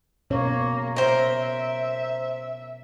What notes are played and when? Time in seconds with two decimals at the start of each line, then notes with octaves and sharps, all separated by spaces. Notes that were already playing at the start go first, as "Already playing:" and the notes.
0.30 B2 A#3 C#4 C#5
0.96 A#4 C5 E5